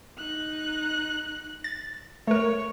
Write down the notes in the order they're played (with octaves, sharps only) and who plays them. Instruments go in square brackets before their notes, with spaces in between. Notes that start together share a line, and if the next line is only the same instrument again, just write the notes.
[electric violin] D#4 F#6
[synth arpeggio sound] A6
[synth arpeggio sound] A3 A#4 [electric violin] C#5